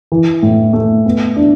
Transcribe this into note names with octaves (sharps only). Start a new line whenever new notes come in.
E3
A2
A3
B3
D4